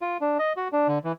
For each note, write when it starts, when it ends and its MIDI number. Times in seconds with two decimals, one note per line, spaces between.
0.02 0.17 65
0.21 0.38 62
0.39 0.53 75
0.57 0.68 66
0.72 0.88 62
0.88 0.99 50
1.04 1.12 52